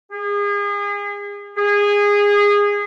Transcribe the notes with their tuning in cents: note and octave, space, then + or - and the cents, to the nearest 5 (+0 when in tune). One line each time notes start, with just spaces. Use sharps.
G#4 -35
G#4 -20